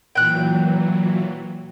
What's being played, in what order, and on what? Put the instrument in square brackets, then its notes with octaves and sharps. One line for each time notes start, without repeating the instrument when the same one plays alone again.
[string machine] A#2 E3 F#3 [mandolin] G5 F#6